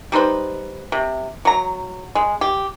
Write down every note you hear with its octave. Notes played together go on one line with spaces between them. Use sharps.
G3 D#4 B4 C5
C3
F#3 A#5
G#3
G4